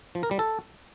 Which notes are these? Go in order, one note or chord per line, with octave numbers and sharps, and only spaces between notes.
F3
A#4
G3
A4